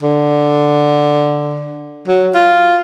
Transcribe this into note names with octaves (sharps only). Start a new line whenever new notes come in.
D3
F#3
F4